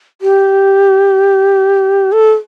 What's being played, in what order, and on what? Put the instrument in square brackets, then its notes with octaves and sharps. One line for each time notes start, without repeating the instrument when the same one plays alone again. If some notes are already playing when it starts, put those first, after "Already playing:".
[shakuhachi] G4
A4